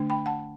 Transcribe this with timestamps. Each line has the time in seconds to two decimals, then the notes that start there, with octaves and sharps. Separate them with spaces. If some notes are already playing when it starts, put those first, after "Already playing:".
Already playing: D3 A3 D4
0.10 G5 B5
0.26 F#5 A5